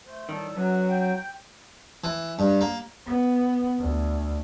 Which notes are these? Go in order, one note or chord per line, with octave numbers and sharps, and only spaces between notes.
A3 C5
A2 D#3 G3 A4
F#2 F#3 B4 C#5 F#5
G5
E3
G2
A#3
B3
D2